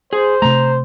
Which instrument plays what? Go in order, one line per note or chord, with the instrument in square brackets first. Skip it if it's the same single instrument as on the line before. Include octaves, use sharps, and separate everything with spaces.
[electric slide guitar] G#4 [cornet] C5
[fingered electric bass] C3 A3 [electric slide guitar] A#5